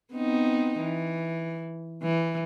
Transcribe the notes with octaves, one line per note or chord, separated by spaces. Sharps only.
B3 C4 D#4
E3
E3